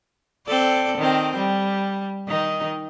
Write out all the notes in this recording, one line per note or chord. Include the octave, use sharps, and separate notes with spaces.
C4 A4 D5
D#3 C4
G3
D#3 D#4